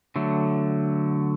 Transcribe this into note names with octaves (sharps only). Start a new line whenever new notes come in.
D3 F#3 A3